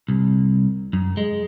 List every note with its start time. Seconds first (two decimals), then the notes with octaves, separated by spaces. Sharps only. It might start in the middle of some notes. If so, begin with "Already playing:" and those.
0.09 C2
0.93 F#2
1.17 G#3